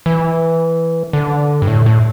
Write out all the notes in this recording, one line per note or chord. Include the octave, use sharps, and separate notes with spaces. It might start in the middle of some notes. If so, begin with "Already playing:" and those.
E3
D3
G2
A2
A2